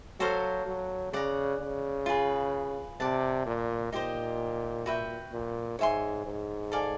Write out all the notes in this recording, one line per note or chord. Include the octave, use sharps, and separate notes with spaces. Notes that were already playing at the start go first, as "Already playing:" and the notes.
F#3 F#4 A4 C5 F5
F#3
C#3 D5 F#5 A#5
C#3
F4 G#4 B4
C3 D5 F#5 A5
A#2
A#2 D#4 G4 C5 D#5
F#4 B4 E5 G5
A#2
G#2 C#5 E5 G#5 C6
G#2
A4 D5 F5 G#5